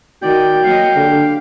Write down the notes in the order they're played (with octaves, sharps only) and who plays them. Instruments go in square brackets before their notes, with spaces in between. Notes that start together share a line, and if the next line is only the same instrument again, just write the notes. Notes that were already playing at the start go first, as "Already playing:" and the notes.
[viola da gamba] D#3 [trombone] F#4 [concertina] D5 [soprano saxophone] G5
[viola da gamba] F#3 A#3 D#5 [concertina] F5
[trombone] D3 [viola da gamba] G4